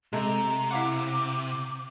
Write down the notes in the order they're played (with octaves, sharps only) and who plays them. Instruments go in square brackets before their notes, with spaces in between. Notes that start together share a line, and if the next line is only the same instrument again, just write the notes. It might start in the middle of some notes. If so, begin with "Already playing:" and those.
[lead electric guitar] C3 [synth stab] G#3 A3 [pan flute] A#5
[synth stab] E4 F5 F#5 [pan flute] D6